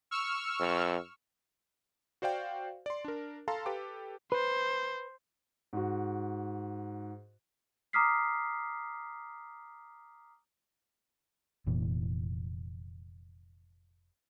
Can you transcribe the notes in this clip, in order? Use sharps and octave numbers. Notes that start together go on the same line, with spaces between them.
C#6 E6 F6
F2
F#4 C5 D5 F5 G5
D5 C6
D4 A#4
A4 F5 A5 A#5 C6
G4 A4 B4 G5 D6
B4 C5
G#2 F#4
A#5 D6 D#6 F6 B6 C7
F1 A#2 E3